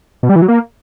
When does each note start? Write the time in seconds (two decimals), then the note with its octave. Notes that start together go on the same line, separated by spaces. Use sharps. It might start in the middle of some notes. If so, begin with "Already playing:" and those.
0.23 B2
0.29 G3
0.36 E3
0.42 F#3
0.48 A#3